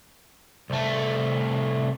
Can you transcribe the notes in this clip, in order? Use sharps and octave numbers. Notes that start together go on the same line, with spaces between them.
C2 A3